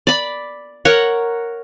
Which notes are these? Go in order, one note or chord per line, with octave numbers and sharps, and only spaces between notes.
D5 B5
A#4 C#5 F#5